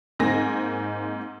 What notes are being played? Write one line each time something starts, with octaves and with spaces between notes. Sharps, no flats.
G#2 A#3 C4 D#4 G#5 A#6